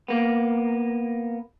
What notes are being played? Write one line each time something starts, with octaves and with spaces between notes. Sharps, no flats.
A#3 B3